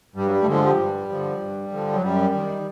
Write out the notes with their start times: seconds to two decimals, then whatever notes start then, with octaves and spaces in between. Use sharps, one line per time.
0.15 G2 G3
0.27 F#3
0.31 G3
0.41 A3
0.47 D3 F3 G#3
0.63 G3
0.78 G2
1.09 D3 F3
1.40 G2
1.71 D3 F3
1.93 F#3
2.02 F#2 G3
2.34 D#3